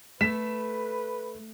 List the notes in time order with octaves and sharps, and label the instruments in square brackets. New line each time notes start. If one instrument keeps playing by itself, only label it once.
[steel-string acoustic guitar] A3 [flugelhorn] B4 [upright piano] B6 E7